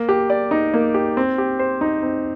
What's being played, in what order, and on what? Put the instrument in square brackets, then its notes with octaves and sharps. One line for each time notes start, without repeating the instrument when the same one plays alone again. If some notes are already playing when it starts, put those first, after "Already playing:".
Already playing: [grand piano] A#3
G4
D5
D#4
A#3
G4
C4
G4
C5
D#4
C4